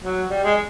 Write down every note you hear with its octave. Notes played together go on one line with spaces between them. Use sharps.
F#3
G3
G#3